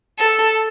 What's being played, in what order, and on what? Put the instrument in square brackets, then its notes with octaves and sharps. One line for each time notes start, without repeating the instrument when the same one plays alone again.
[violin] A4